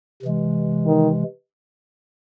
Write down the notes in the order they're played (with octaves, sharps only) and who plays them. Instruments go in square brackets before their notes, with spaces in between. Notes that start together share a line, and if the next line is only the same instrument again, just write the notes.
[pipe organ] C3 E3 G#3
[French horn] D#3